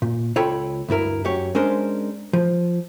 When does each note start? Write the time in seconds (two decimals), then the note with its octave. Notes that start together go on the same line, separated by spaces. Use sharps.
0.02 A#2
0.36 C#2 F4 A4 C#5 G5 B5
0.89 D2 G2 E4 A#4
1.25 F#2 G4 C#5
1.55 G#3 C#4 D4 A#4 C5
2.33 F3